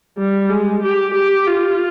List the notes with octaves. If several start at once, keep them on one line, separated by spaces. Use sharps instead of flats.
G3
G#3
G4
G4
F4